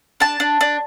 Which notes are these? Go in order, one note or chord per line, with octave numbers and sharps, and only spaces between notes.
D4 A5
D4
D4